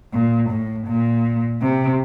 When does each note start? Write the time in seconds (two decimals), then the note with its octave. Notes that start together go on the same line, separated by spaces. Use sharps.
0.13 A#2
0.50 A2
0.87 A#2
1.62 C3